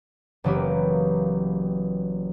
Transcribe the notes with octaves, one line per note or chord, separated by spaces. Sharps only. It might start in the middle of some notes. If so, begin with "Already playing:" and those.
F#1 E3 F#3 A#3 B3 G4